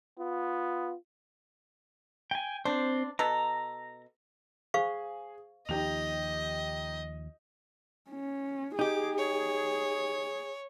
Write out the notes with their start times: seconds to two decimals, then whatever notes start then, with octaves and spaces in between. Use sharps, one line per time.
0.19 B3 F4
2.31 G5 G#5
2.65 C4 D4 C5
3.19 B2 A4 A#5
4.74 G#4 C5 F5 C#6
5.69 D#2 F3 D#4 G4 D#5 F7
8.11 C#4
8.79 D#4 G4 G#4 D6
9.18 C#5